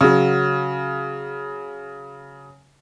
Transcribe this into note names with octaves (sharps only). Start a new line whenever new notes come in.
C#3 F#3